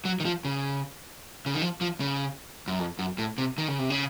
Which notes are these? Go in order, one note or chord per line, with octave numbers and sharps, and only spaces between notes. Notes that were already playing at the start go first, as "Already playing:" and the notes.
F#3
D#3
F3
C#3
C#3
D#3
F3
F3
C#3
F#2
F2
F#2
A2
C3
D#3
C#3
C3
C#3